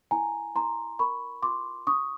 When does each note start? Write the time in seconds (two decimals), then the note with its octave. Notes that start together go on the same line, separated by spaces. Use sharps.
0.11 E4 G#5 A#5
0.55 E4 A#5 C6
0.99 A#4 B5 C#6
1.42 F4 C6 D6
1.87 D4 C#6 D#6